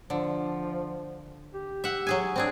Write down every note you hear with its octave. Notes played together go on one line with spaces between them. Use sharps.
D3 F3
G4
E5 F#5
F#3 G#4 G#5
C4 D4 G#4